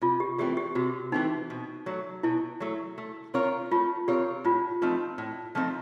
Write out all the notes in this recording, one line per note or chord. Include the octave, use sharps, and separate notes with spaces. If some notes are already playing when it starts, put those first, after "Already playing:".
C3 F4
G4
E3 A3 C4 G4
G4
C3 F#4
E3 A3 C4 D#4
B2
F#3 A3
B2 E4
F#3 A3
A3
C4 F4 A#4 C#5
A3 F4
C4 F4 G4 A#4 C#5
A2 F4
F3 A3 C4 D#4
A2
F3 A3 C4 D#4